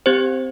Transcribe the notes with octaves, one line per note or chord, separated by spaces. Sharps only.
C4 G4 C5